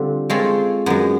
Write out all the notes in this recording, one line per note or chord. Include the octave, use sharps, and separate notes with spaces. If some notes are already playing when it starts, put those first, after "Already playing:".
Already playing: D3 G3 C4 F4
G#3 C4 F4 A4 C#5
F#2 D#3 G#3 B3